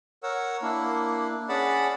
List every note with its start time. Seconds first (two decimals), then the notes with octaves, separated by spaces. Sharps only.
0.23 A#4 C#5 F#5 E6
0.62 A#3 D4 E4
1.49 C#4 G#4 D5 F#5 A5 B5